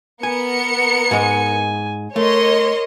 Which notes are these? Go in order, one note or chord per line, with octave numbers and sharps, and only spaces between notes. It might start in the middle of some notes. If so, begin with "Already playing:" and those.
B3 A#4 G#5 C#7
G#2 G#3 G#5
A3 A#4 C#5 D#5 C6